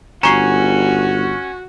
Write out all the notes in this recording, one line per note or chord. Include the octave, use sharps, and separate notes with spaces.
G1 C#4 F#4 A#5 C#6 C7